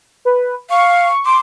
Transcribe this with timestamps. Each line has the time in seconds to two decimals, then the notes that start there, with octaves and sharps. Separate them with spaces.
0.25 B4
0.70 F5 C#6
1.26 C6 D6